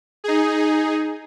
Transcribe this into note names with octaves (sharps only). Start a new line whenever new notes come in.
D#4 G#4